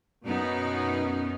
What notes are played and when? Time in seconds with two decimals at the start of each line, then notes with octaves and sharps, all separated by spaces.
0.24 F#2 B2 B3 C#4 D#4